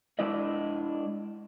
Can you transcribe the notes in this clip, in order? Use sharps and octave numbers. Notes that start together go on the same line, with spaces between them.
G#3 D4 E4 D5 D#5